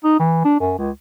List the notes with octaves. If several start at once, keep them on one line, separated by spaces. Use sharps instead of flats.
D#4
E3
D4
F#2
C#2